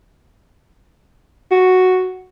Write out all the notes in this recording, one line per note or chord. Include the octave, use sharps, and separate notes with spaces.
F#4